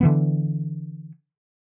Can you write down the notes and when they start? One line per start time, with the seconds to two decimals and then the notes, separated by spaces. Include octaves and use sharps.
0.01 D3 E3 B3